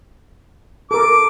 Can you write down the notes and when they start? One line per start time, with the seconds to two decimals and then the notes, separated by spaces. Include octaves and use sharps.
0.91 A4 A#4 D6